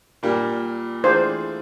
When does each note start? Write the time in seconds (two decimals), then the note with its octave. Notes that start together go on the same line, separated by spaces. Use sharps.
0.23 A#2 G3 A#3
1.04 E3 A3 D4 F4 G#4 C5